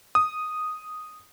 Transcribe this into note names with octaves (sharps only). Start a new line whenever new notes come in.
D#6